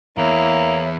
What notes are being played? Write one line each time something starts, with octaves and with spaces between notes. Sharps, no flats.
E2 A#3 E4 C#5